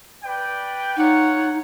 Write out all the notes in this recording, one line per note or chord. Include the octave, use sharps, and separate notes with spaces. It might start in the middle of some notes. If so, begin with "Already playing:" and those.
B4 D5 G5
D#4 F4 C#5 F#5